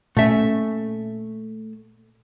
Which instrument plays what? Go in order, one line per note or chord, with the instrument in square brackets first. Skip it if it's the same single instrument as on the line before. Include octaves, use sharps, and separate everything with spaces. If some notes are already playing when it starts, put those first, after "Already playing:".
[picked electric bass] A#2 C#4 [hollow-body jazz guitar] A3 E5